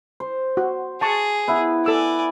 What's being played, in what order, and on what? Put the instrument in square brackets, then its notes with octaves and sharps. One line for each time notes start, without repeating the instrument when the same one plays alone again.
[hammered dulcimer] C5
[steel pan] F#4
[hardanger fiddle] G#4 [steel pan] G#5 A5 C#6
[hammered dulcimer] B3 E4 B4
[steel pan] A4 E6 [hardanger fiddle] D5 G#5